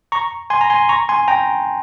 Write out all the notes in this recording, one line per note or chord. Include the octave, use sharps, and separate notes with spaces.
A#5 C#6
G#5 C6
A#5
G#5 C6
A#5 C#6
G#5 C6
G5 A#5